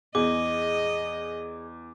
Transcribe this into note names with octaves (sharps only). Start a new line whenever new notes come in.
E2 G#4 D#5 D6